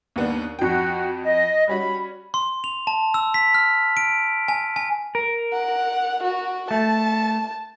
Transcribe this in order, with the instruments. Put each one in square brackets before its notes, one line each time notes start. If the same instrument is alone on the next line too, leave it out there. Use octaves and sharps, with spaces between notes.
[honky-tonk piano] D#2 B3 D4
[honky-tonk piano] F2 G5 [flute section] F#4
[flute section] D#5
[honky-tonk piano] G3 C#4 F#4 [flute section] B5
[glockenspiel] C6
F7
A5
E6
B6
F6
D7
G#5
G#5
[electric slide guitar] A#4
[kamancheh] F#5
F#4
[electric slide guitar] A3 [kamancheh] A5